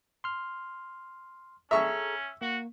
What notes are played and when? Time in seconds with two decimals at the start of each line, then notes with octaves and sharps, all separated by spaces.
0.24 C6 F6
1.71 C#4 G#4 A4 E5 A#5 C#6 E6
2.42 A#3 F#4